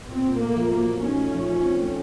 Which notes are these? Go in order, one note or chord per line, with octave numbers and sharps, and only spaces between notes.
A#2 C4
A#2
A3 A#3
F3
F#3 A#3
F#3
C#4 D#4
A3
F3
F3
C4
A3